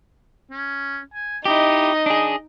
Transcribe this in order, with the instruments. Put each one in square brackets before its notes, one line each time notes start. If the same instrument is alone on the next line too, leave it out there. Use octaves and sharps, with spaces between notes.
[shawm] C#4
G#5
[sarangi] D#4 [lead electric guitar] E4 G4 [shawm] D#5
[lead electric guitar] D4 G#4